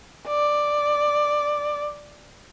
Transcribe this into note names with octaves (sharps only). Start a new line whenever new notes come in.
D5